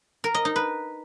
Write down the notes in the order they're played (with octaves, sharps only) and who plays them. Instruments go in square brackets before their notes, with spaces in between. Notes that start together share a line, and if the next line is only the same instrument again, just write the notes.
[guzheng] A#4
D#5
D#4
B4